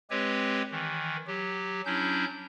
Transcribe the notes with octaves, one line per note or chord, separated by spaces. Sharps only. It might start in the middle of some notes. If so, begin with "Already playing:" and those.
G#3 C4 G4 B4 C#5
D#3 E3
F#3 G4
F#3 C#4 D4 E4 G6